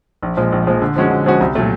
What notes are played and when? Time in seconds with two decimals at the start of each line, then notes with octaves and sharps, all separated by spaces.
0.23 A#1
0.37 A#2 F3 G#3
0.52 A#1
0.67 A#2 F3 G#3
0.82 D3
0.96 F3 G#3 C#4 F#4
1.11 D3
1.26 F3 G#3 C#4 F#4
1.41 C2
1.55 A#2 F#3 A3